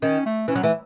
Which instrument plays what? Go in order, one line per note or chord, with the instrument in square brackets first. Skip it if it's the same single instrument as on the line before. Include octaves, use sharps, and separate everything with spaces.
[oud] D#3 [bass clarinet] C#4
[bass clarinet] A3
[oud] E3 [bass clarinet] C#4
[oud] F#3
[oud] E3 [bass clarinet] A3